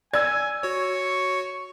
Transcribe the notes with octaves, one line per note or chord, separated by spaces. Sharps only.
D5 G#5 E6 G#6
F#4 C#5 C#6